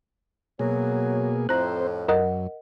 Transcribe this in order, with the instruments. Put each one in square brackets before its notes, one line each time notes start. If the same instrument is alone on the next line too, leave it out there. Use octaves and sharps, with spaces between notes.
[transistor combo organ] B2 A#3 G#4 [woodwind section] F#3
[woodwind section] F2 A2 [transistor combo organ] C4 C5 [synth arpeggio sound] A#5 F#6
[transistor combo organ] F#2 [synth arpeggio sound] A#4 D#5 F#5